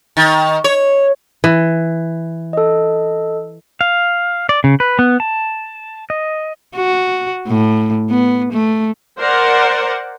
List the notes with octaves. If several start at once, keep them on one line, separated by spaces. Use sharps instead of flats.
D#3
C#5
E3
A4 D#5
F5
D5
C#3
B4
B3
A5
D#5
F#4
A2
B3
A3
A#4 C5 D5 F#5